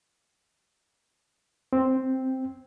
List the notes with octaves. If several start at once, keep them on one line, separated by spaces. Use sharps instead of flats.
C4